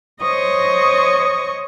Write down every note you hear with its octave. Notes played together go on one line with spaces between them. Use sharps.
C5 C#5 D#5 C#6 D#6